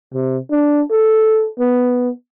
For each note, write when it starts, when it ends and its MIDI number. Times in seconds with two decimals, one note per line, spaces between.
0.14 0.38 48
0.51 0.82 62
0.91 1.48 69
1.59 2.09 59